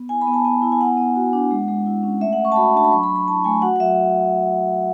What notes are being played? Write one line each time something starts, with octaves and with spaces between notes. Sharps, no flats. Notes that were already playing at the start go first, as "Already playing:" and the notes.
Already playing: B3
E4 G#5
B5
B3
A5
B3 G#5
E4
G#5
B3 F#5
B3
F#4
D4
G#3
G#3
E4
C#4
A3 E5
F#5
A3
C#6
A5
F#4 B5
D4 A5
B5
F#3 C#6
B5
F#3
B5
E4 A5
A3 G#5
F#4 F#5
F#5
F#3 E5